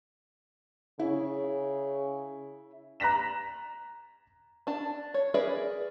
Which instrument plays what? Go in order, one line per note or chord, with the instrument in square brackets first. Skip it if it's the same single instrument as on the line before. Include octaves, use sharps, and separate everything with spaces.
[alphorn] C#3 [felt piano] E4
[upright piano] A#5 F#6 A#6 B6 E7
[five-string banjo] D4 A5
C#5
G#4 A#4 B4 D5 E5